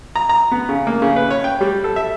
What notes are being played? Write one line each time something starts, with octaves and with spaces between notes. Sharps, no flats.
A#5
A#5
B3
C#3
A#3
C#3
B4
C#5
G5
G3
A4
E5